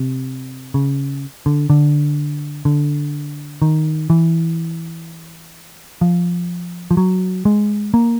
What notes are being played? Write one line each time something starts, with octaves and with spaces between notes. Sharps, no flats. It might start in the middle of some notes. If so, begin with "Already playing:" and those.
Already playing: C3
C#3
D3
D3
D3
D#3
E3
F3
F3
F#3
G#3
A#3